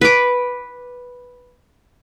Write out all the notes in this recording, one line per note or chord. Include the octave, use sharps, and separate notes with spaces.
B4 D6